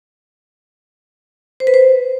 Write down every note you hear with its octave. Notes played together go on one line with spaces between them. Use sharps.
C5
B4
C5